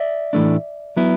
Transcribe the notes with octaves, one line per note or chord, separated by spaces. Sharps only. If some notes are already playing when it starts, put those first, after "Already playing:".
Already playing: D5 E5
A2 E3 A3 D4
F#3 B3 E4